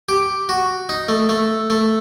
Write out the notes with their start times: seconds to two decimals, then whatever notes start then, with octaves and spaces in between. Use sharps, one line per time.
0.09 G4
0.49 F#4
0.89 D#4
1.09 A3
1.29 A3
1.70 A3